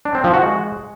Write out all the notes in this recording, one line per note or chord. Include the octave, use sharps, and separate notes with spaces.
D4
C4
F3
F#4
G#3